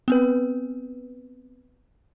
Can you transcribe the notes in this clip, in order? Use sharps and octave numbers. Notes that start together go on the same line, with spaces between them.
B3 C4 B4